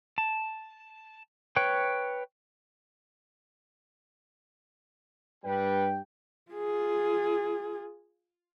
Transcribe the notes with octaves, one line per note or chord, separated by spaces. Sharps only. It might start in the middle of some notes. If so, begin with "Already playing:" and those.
A5
B4 C#5 G5
G2 G3 G4 B4 G5
F4 G#4